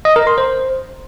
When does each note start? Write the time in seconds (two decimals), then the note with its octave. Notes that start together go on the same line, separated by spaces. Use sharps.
0.05 D#5
0.16 A#4
0.27 C6
0.38 C5